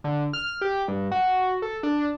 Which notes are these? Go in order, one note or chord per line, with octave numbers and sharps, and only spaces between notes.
D3
F6
G4
G2
F#4
A4
D4